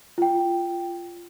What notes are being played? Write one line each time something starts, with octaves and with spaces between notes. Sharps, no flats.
F4 G5